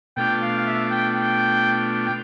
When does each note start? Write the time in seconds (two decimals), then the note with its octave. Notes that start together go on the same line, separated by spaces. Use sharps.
0.17 B2 A3 D4 F4 G5
0.42 F5
0.58 F5
0.66 E5
0.91 G5
1.14 G5
2.06 G5